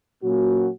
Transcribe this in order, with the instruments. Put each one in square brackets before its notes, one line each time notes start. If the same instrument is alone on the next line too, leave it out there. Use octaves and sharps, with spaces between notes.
[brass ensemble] A#2 F#3 A#3 C#4 F#4